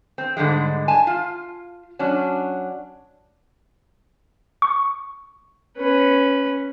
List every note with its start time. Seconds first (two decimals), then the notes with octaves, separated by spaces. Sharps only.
0.18 C4
0.37 G#2 D3 G3 G#3
0.88 G#5 A5
1.07 F4
1.99 F#3 C#4 D4
4.62 C#6
5.78 C#4 B4